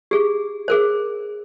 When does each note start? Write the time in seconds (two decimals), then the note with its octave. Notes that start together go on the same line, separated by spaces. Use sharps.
0.11 G4 G#4
0.68 G#4 A#4 C5